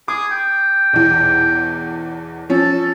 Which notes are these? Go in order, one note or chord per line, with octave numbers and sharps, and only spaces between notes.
G#4 D6
G5
B1 E2
F3 C#4 A4